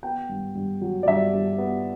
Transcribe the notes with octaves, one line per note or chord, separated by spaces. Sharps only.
B3 G5
G2
G2
F#3
D5
G2 E5
G2
B3